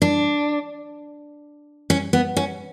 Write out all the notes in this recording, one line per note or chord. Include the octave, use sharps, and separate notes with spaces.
D4
C#4
B3
C#4